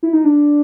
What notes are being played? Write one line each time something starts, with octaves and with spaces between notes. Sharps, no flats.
E4
D#4
D4